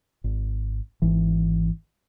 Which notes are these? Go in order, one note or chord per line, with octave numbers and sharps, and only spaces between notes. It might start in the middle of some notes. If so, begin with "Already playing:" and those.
G#1
G#1 E3